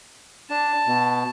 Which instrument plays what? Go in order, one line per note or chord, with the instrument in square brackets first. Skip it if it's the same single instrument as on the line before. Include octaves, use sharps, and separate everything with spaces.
[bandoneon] D4 [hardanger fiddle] A5
[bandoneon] B2